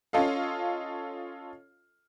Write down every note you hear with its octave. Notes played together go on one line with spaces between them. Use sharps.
C#4 F4 A4 D#5 F5